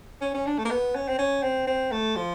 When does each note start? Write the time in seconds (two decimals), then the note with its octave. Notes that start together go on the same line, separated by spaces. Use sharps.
0.21 C#4
0.34 C#4
0.46 D4
0.58 A3
0.65 A#3
0.70 B3
0.95 C#4
1.08 C4
1.18 C#4
1.43 C4
1.67 C4
1.92 A3
2.16 F3